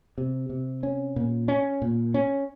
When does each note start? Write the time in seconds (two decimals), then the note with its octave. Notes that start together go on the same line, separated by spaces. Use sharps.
0.18 C3
0.50 C3
0.83 C#4
1.16 A#2
1.48 C#4
1.82 A#2
2.14 C#4